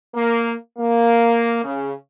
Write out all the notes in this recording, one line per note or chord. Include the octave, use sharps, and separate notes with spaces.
A#3
A#3
C#3